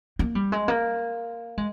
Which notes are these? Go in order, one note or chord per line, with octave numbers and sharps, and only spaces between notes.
A#3
G3
G#3
A#3
G#3